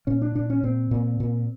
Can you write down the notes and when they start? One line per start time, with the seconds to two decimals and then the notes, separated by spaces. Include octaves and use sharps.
0.07 A#2 C#4
0.22 D4
0.35 A#2 D4
0.50 C#4
0.63 A#2 C4
0.91 A#2
1.20 A#2